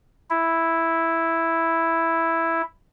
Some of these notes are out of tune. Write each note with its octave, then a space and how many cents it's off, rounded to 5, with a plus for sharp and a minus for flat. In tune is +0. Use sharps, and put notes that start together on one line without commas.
E4 +0